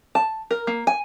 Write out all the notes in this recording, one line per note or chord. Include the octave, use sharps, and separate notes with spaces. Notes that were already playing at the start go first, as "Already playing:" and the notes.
A5
A#4
A#3
G#5